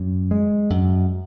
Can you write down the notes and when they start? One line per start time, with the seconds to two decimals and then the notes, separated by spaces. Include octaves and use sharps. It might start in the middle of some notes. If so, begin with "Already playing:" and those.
Already playing: F#2
0.31 G#3
0.70 F#2